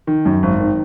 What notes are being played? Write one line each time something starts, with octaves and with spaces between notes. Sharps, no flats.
D#3
F#2
G#1
D#3